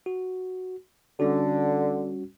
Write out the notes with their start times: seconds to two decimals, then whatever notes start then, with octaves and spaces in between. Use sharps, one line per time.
0.06 F#4
1.20 D3 G3 C#4 F#4